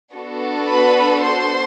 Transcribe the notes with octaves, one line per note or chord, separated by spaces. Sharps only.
B3 D4 F#4 A4
B4 B5
C5 C6